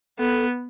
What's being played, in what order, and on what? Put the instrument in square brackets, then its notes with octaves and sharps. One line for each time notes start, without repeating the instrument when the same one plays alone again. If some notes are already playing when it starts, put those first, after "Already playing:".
[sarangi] B3 [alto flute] A4